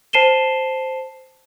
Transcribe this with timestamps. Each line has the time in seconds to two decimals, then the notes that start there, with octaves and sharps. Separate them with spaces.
0.13 C5 A5 C7 D#7 E7 G7